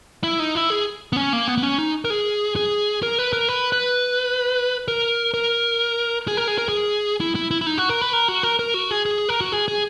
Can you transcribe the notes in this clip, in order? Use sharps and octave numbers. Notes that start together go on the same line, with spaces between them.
E4
D#4
E4
G#4
B3
C#4
A#3
B3
B3
C#4
D#4
A#4
G#4
G#4
A#4
B4
A#4
B4
B4
A#4
A#4
G#4
A#4
G#4
A#4
G#4
E4
E4
E4
E4
D#4
F#4
A#4
B4
A#4
F#4
A#4
A#4
F#4
G#4
G#4
A#4
F#4
G#4
G#4